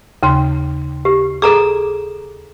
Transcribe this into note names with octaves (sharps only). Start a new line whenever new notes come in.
D#2 C#3 C6
G4
G#4 A4 A#5 D6